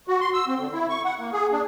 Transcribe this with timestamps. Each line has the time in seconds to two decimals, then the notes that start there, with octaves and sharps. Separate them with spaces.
0.08 F#4
0.21 C6
0.33 E6
0.47 C4
0.59 D3
0.73 E4
0.89 C#6
1.04 F#5
1.19 A#3
1.32 G#4
1.52 D4